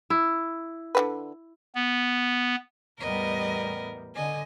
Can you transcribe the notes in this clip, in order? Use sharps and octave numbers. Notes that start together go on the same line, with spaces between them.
E4
D3 A#3 B4
B3
E2 A2 G3 B3 A#4 D#5
D3 D#5 G#5